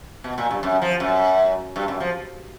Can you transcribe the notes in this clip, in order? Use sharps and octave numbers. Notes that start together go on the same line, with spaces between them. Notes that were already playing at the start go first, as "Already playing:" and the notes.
B2
A#2
G2
F#2
F3
F#2
G2
F#2
F3